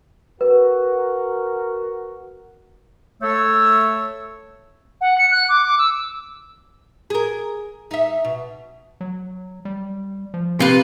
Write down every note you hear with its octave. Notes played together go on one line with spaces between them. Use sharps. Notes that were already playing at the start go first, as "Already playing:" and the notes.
F#4 A#4 B4
A3 C#5 E6
F#5
C#7
F#6
D6
D6
E6
G#4 A#4
D#4 E5
B2
F#3
G3
F3
C3 F4 B4